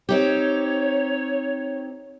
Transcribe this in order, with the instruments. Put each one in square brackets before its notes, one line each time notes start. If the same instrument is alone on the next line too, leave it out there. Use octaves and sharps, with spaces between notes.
[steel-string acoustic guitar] C4 D#4 G4 [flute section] C#5